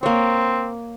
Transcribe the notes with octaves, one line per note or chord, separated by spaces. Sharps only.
A#3 C4 C#5